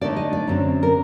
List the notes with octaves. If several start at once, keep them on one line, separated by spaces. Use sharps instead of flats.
D3 A3 D#4 D5
D#5
D5
F#2 D3 F#3 C4
A#4